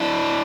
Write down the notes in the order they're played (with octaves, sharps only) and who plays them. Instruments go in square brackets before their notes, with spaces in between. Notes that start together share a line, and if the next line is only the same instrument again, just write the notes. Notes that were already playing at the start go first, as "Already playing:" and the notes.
Already playing: [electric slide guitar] D4 E4